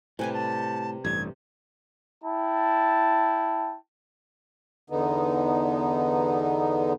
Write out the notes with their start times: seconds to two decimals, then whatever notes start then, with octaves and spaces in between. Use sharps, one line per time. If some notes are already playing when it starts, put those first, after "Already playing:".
0.19 A2 C3 G3 B4 G#5
0.34 A5
1.05 A1 G2 G#6
2.24 E4 G5 A5
4.90 E2 D3 B3 D#4